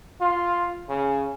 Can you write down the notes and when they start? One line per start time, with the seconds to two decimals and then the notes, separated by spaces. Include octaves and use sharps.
0.21 F4
0.89 C#3